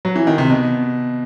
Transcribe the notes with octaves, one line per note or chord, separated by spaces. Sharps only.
F#3
E3
D#3
C3
B2